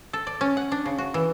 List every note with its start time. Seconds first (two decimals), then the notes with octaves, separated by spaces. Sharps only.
0.13 A4
0.27 D5
0.41 C#4
0.57 F#5
0.72 D4
0.86 C#3
0.98 F#4
1.14 E3